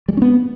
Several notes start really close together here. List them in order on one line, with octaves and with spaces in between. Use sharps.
G3 G#3 C#4 B3